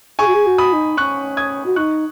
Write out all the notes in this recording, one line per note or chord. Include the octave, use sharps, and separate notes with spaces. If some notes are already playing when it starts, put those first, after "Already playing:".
G#4 G#5 C#6
F#4
G#4
F#4
B5 D#6
D#4
C#4 C#6 F#6
D#6 G#6
F#4
D#4 C#6 F#6